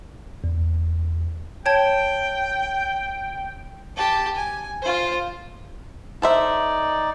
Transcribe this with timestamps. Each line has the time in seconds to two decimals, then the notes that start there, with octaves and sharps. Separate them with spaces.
0.44 E2
1.66 C#5 G5 A5 G#6
3.97 G4 A5
4.35 G#5
4.82 F4 C5
6.22 D#4 A4 C5 D5 E5